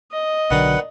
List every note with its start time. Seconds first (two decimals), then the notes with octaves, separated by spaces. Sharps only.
0.11 D#5
0.50 B1 D3 D#3 F#3 D4 D#4 B4 F#5